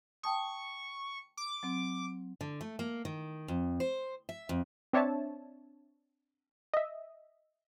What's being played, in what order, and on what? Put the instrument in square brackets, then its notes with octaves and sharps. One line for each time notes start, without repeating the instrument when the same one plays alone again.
[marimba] G5 A5 D#6 [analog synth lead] C#6
[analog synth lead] D6
[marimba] F#3 C4
[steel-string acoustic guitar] D3
A3
A#3
D#3
F2
C5
E5
F2
[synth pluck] C4 D4 C#5 E5 A5
D#5 E5